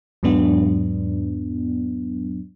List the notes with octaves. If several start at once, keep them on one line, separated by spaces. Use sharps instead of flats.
E2 G#2 F#3 B3 D4